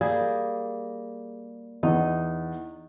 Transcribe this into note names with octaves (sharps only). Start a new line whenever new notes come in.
G3 A#3 G#4
E2 D#4